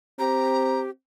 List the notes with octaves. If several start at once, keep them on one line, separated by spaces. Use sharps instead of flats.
C4 G4 A#5